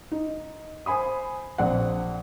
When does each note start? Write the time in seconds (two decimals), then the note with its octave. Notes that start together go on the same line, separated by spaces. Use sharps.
0.12 D#4
0.86 C5 G#5 B5 D#6
1.58 A#1 C4 F#5